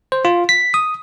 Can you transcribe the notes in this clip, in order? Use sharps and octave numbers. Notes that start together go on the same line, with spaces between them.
C5
F4
B6
D#6